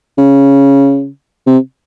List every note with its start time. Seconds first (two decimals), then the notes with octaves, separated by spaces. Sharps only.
0.18 C#3
1.46 C3